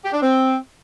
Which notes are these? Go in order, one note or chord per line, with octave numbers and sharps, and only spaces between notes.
G4
D4
C4